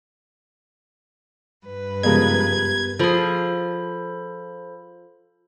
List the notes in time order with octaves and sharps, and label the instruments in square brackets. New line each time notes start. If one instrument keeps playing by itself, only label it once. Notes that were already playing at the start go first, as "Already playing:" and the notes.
[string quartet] G2 B4
[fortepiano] C#3 F3 G#3 [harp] B3 G4 A#4 [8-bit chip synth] G#6
[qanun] F3 G#4 [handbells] A4 C5 B5